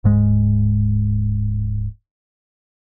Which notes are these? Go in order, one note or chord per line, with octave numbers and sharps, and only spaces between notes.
D1 G#2 G#3